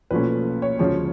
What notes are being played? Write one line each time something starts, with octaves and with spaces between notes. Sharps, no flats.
B1 A#2 F3 A3 C#4 B4
C#5
D2 C#3 F3 G#3 C#5